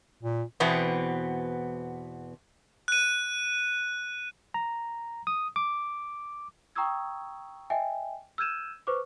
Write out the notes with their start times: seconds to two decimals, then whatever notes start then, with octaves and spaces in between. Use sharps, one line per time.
0.23 A#2
0.60 E2 B2 B3 C4
2.88 F#6 D#7
4.54 A#5
5.27 D#6
5.56 D6
6.75 G5 A#5 C#6 D#6 E6 G#6
7.70 D#5 E5 G5 G#5
8.38 E6 F6 G6 G#6 D#7 E7
8.87 B4 C5 C#6 D6